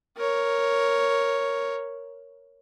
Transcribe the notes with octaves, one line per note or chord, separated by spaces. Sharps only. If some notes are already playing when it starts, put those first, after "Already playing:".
A#4 C#5